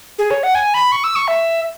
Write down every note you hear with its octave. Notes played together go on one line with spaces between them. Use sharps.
G#4
C#5
F#5
G#5
B5
C#6
E6
C#6
E5